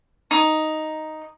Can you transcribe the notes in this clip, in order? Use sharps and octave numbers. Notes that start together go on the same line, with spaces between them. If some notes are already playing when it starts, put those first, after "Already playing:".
D#4